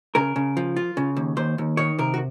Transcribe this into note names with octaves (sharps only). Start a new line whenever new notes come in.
C#3 A#4
C#3
F3
F4
C#3
D#2
D#2 C5
D#2
D#3 C#5
C3 A#4
F#4